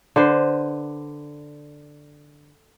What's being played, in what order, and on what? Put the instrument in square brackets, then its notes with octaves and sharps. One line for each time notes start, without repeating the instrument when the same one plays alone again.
[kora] D3 B4 C5